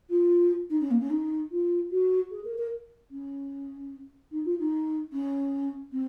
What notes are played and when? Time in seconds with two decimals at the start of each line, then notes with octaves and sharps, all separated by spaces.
0.10 F4
0.70 D#4
0.81 C#4
0.91 A#3
1.00 C#4
1.10 D#4
1.51 F4
1.91 F#4
2.31 G#4
2.45 A#4
2.58 A#4
3.11 C#4
4.32 D#4
4.45 F4
4.59 D#4
5.13 C#4
5.92 C4